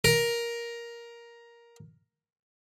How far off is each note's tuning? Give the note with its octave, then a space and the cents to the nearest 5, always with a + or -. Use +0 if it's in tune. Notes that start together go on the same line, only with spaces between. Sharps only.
A#4 +10